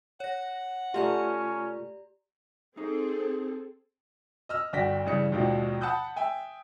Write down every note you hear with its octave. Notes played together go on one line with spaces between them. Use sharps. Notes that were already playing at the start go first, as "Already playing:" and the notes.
C#5 F#5 A#6
A3 C#4 F4 G4 D5 A#5
C4 D#4 G#4 A4 C5
D#5 E6 F6
G1 D4 F#4 G5 A#6 B6
G2 C#3 E3 D4 C#7
D#2 G#2 B2 F3 D4
F#5 A5 B5 D#6 F#6 G6
E5 G5 G#5